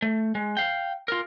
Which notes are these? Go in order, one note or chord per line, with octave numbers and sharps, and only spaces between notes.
A3
G#3
F5 G5
F4 A#4